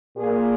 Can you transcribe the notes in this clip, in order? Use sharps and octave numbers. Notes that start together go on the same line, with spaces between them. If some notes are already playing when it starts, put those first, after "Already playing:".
A#2 A#3 G#4